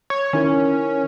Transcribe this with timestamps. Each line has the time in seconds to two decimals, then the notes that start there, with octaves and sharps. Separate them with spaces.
0.10 C#5
0.33 D#3 C#4 E4 A#4